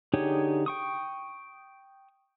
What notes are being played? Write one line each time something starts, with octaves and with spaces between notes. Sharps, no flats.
D3 D#4 G4 G#4 C#5
G5 C#6 D#6